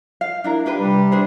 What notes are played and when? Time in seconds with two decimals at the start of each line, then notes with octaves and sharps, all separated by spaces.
0.21 F5
0.44 D4 E4 A#4
0.66 D4 G4 B4
0.80 C3 G3
1.12 D4 G#4 C5